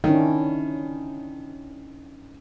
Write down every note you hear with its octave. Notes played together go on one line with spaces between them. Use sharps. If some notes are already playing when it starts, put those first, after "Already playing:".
D#3 C#4 D4 E4